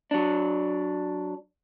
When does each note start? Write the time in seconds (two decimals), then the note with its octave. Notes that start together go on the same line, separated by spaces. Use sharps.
0.11 F#3 D4